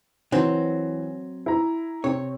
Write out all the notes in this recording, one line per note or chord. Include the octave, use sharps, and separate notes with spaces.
E3 F#3 C4
E4 A#5
C3 C4 C#5